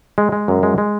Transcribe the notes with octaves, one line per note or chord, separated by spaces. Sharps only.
G#3
G#3
F#2
G#3
G#3